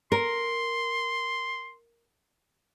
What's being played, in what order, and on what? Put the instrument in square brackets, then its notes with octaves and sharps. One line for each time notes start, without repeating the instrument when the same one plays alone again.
[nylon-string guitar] A#4 [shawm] C6